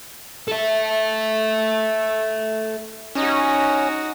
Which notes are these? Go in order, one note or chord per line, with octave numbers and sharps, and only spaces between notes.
A4 E5
C#4 D#4 F#4